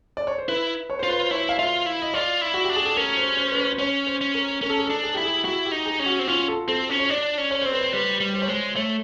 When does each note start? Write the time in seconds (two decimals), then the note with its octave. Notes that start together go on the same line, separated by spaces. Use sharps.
0.17 D5
0.27 C#5
0.38 C5
0.48 E4 B4
0.90 C#5
0.99 F4 C5
1.09 B4
1.19 C5
1.31 E4 C#5
1.49 F5
1.58 F4 E5
1.86 E4
2.02 D#5
2.14 F4 D5
2.41 E4
2.54 F#4
2.64 G4
2.69 D4
2.76 G#4
2.85 A4
2.96 C#4 A#4
3.17 C5
3.37 C5
3.52 B4
3.58 C5
3.73 C5
3.79 C#4 C#5
4.07 C5
4.21 C#4
4.35 A#4
4.61 C#4 A#4
4.70 A4
4.78 G#4
4.87 D4 A4
5.04 G#4
5.14 E4 G4
5.24 G#4
5.44 E4 F#4
5.65 G4
5.72 D#4
5.86 G#4
5.99 C#4
6.06 F#4
6.19 C4
6.27 C#4 F4
6.48 A4
6.68 C4 A4
6.89 C#4
6.99 C#5
7.09 D4 D5
7.38 C#4
7.51 C#5
7.62 C4 C5
7.72 B4
7.81 C5
7.93 G3 B4
8.21 G3
8.34 C5
8.42 C#5
8.48 G#3 C5
8.76 A3 C#5